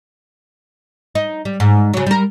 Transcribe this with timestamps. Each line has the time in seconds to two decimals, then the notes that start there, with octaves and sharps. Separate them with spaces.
1.15 D#4
1.45 G3
1.60 G#2
1.93 C#3 F#3
2.06 G3 A#4